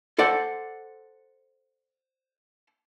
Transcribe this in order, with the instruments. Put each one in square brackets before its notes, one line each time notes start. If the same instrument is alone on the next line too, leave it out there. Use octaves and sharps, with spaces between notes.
[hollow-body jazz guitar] A4 C5 D5 F#5